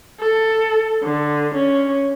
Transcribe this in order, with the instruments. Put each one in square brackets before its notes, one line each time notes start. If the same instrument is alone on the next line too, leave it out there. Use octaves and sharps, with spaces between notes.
[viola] A4
D3
C#4